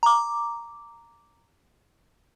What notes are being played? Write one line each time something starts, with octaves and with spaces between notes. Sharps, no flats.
A#5 D6